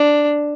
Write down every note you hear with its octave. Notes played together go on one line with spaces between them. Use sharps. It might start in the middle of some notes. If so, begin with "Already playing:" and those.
Already playing: D4